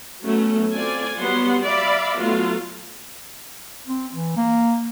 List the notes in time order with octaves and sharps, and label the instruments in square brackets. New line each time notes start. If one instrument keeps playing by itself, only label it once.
[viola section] F#3 A3 B3 C#4
C4 F4 A4 D5 G#5
F#3 G3 B3 F#5 C6
D5 E5 F5 B5
F#3 A3 B3 F4 F#4 F5
[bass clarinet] C4
E3
A#3